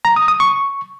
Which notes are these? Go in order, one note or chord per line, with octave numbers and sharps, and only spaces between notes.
A#5
D#6
D#6
C#6